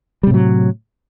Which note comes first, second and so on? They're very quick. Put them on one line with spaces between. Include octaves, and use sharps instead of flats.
G3 C3 A2 F#3